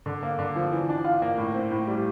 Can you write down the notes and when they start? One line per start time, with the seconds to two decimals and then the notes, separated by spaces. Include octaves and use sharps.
0.06 D3
0.23 A#3
0.39 D3
0.56 F3
0.72 E3
0.89 D4
1.04 F4
1.22 A#3
1.37 A2
1.54 C4
1.71 A2
1.87 G3